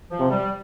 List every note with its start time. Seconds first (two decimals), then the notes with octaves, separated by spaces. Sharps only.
0.10 F3
0.20 C3
0.29 G3